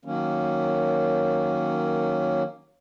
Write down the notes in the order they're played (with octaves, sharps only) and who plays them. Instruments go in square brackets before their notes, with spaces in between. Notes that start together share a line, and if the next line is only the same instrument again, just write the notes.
[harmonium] D#3 F#3 A#3 C#4